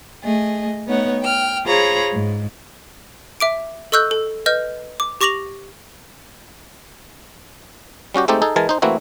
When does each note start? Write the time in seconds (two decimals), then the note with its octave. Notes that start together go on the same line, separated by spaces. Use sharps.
0.24 A3 G#4 D#5
0.86 A3 B3 D#4 C#5 F#5
1.21 G5 F6
1.67 F4 G#4 C5 C#5 A#5 B5
2.12 G#2
3.40 E5 D6 D7
3.92 A4 D#5 C#6 E6 F#6 G6
4.11 A4
4.46 B4 D#5 F6 G6
5.00 D6
5.21 G4 C#6 D6 A#6 F7 F#7
8.14 G3 C#4 F#4 G4
8.28 G#3 A3 C4 D#4 G4 A4
8.42 D#4 G#4 A4
8.56 E3 G#3 A#4 G#5 A5
8.69 D#4 C5
8.82 E3 A3 A#3 C4 E4 F#4